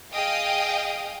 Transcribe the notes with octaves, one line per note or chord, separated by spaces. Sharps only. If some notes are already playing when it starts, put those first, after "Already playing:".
G#4 D#5 F5 G5 D#6